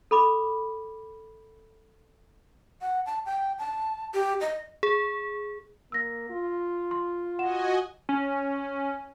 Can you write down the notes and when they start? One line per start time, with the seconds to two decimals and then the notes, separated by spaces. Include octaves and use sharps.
0.11 A4 B5 D6
2.81 F#5
3.06 A5
3.26 G5
3.59 A5
4.14 G4
4.41 D#5
4.83 G#4
5.92 A#3 E6 A#6
6.30 F4
6.91 C6
7.39 F#4 D#5 F#5 G#5 E7
8.09 C#4